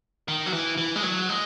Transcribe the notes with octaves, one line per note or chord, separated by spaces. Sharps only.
D#3
F#3
E3
E3
G#3
F#3
G#3